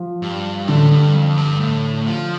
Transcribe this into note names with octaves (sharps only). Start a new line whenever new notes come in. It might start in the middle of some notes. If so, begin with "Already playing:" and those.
Already playing: F3
G2
A2 D3
G2
F2
G2
A2
F3